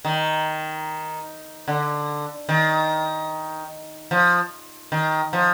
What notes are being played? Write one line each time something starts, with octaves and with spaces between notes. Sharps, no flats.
D#3
D3
D#3
F3
D#3
F3